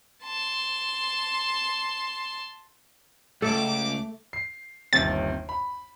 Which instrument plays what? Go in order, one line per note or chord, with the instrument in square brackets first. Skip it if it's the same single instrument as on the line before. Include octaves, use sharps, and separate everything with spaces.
[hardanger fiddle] A5 C6
[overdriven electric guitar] C#2 [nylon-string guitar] A3 [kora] A4 [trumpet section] D6
[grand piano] C7
[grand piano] G1 D#2 C3 [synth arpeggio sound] A6
[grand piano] B5